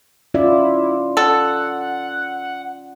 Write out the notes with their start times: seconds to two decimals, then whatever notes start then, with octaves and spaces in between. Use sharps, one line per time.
0.34 C#4 E4 F4 D5
1.17 A4 F#5